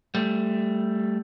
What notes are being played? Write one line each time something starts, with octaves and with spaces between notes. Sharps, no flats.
G3 A3